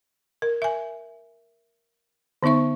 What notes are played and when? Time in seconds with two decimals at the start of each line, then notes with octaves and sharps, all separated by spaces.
0.42 A#4
0.62 E5 G#5
2.43 D3 B3 D#4 E5 C#6